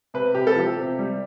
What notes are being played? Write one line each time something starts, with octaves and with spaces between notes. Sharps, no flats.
C3 B4
C3 G4
A4
F3 G4
C3
G3